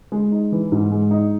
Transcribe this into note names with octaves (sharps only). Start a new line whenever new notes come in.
G#3
D#4
E3
G#2
G#3
D#4